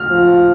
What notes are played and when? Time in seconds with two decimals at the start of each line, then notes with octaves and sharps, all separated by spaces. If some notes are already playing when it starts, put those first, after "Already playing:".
Already playing: F6
0.10 F3